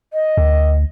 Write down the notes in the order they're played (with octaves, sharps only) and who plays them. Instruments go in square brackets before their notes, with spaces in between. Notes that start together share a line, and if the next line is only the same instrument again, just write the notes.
[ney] D#5
[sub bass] D2